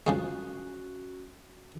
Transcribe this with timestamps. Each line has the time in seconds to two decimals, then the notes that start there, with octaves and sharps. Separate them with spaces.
0.07 C#3 F3 G#3 C#4 F#4